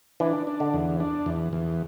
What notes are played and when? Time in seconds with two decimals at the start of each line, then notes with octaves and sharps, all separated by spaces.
0.20 E3 D4
0.47 D4
0.60 D3
0.74 E2
1.00 D4
1.26 E2
1.53 E2